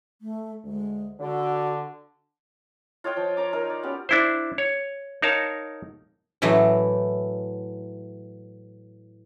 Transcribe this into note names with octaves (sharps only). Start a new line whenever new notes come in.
A3
D2 G#3
D3 F#4
F4 C#5 D#5 G5
F3
C#5 A#5 D6
D#4 F4 A#4 D#5
D5
B3 C#4 F#4 G4
D4 E4 C5
C#5
D#4 A#4 C#5 F5 A5
A2 E3 F#3 A3